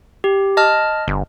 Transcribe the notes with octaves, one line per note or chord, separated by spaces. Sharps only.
G4
D#5 A5 F6
G1